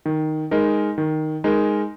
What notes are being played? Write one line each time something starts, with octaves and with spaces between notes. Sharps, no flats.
D#3
G#3 D#4 A#4
D#3
G#3 D#4 A#4